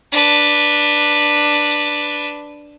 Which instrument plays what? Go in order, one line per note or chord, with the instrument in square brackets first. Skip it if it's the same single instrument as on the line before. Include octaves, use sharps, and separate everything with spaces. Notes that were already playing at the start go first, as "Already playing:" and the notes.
[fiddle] D4 B4